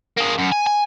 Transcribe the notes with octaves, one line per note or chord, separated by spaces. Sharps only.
A#3 G#4
F#2
G#5
G#5